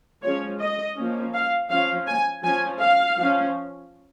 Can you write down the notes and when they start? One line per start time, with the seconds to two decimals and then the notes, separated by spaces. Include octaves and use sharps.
0.22 F3 G#3 C#4 C#5
0.60 D#5
0.96 F3 A#3 C#4
1.34 F5
1.69 F3 C#4 F5
2.07 G#5
2.43 F3 C#4 G#5
2.80 F5
3.17 F3 C#4